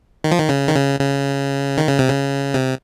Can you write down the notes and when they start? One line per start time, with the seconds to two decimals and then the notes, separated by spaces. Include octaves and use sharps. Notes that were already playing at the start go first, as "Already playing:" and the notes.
0.24 D#3
0.31 F3
0.38 D#3
0.49 C#3
0.68 D#3
0.75 C#3
1.00 C#3
1.77 D#3
1.88 C#3
1.99 C3
2.10 C#3
2.54 C3